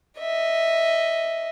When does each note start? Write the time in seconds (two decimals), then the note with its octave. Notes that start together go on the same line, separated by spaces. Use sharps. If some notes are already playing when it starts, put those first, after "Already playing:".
0.20 D#5 E5